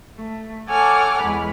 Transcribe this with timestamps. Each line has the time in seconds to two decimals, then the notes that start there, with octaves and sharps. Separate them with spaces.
0.16 A3
0.69 A4 C#5 F#5 G#5 D6 F6
1.21 E2 G#3 B5